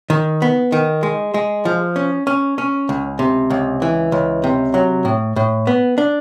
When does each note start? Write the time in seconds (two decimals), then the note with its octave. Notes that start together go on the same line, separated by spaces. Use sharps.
0.10 D#3
0.42 B3
0.72 D#3
1.03 G#3
1.34 G#3
1.65 F3
1.96 C#4
2.27 C#4
2.58 C#4
2.89 C#2
3.19 C3
3.50 C#2
3.82 E3
4.12 C#2
4.44 C3
4.74 F#3
5.05 A2
5.36 A2
5.67 B3
5.98 D4